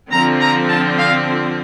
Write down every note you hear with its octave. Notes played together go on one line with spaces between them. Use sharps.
D3 F3 C4 A#5
A#5
A5
F5